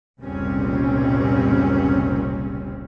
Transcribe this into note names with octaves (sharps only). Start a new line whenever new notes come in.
F1 C#2 A#2 G3 C4 C#4